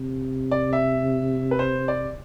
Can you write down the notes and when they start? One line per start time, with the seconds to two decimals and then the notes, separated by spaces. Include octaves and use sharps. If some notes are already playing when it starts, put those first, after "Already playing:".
Already playing: C3
0.51 D5
0.73 E5
1.51 B4
1.59 C5
1.88 D5